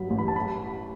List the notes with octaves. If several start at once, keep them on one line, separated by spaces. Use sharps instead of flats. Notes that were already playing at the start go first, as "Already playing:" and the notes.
Already playing: G2 F#3 B5
A1
B5
A5
B5